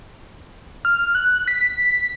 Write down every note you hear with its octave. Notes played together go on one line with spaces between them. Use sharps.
F6
F#6
B6